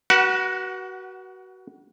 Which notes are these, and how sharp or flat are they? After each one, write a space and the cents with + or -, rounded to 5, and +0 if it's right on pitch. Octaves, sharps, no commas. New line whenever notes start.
F#4 +20 B4 -35 F#5 +0